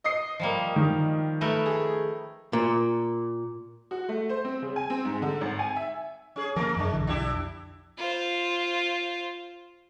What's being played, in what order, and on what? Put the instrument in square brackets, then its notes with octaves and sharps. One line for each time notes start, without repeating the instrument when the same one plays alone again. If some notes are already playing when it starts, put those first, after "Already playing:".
[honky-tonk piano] D#5 D#6 C7
[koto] F3 G3 A#3
[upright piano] D#3
[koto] A3 A#4 B4
[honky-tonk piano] G#4
[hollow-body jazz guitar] A#2
[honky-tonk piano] F#4
A3
C5
C4
C#3
G#5
C4
G#2
D3
G#1
G#5
E5
[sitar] C#4 G#4
[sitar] C3 A#4 [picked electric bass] F3 A#3
[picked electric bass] F#2 [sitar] G#3 D4
[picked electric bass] B1 D3 E3
[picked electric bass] B1 F2 [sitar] D4 E4 G4
[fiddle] F4 C5